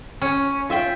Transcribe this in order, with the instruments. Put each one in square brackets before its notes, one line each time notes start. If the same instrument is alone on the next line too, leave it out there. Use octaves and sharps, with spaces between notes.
[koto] C#4
[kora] F4 E5 G5